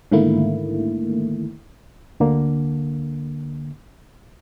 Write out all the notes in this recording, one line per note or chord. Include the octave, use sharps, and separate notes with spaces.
G#2 D3 D#3 A3 A#3 E4
D2 D3 A#3